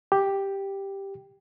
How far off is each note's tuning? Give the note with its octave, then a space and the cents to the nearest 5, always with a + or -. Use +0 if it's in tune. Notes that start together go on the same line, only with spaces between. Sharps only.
G4 +0 G5 +0